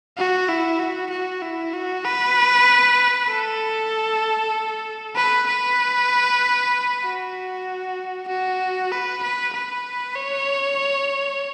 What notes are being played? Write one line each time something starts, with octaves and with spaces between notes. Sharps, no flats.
F#4
E4
F#4
F#4
E4
F#4
B4
A4
B4
B4
F#4
F#4
B4
B4
B4
C#5